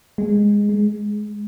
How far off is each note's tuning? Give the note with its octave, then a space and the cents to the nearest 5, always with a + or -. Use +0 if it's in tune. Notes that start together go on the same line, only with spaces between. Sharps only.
G#3 -10
G#3 +15